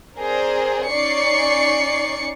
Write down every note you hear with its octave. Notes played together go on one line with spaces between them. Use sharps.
C4 G#4 A#4 C5 D5
C#4 D#4 D5 C#6 C7 C#7